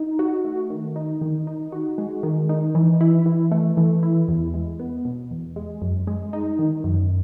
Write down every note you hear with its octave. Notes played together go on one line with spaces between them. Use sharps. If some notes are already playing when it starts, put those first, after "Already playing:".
Already playing: D#4
F#4
A3
D#3
D#4
D#3
D#4
F#4
G#3
D#3
D#4
E3
E4
E3
A3
E3
E4
E2
G#3
B3
B2
E2
G#3
F#2
G#3
D#4
D#3
F#2